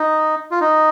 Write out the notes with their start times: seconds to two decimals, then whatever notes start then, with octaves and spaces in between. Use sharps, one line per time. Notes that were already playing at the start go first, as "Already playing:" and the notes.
Already playing: D#4
0.51 F4
0.61 D#4